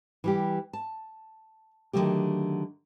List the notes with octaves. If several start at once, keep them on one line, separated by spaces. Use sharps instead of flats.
E3 G3 G4
A5
D3 D#3 F3 F#3 A3 G4